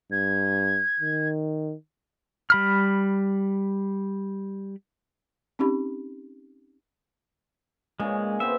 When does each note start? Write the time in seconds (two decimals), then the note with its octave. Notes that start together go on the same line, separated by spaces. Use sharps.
0.12 G2 G#6
1.00 D#3
2.50 G3 B5 F6
5.59 C4 C#4 D#4 G4 B5
8.00 A#2 C#3 G#3 C#4
8.40 B3 C4 C5 E5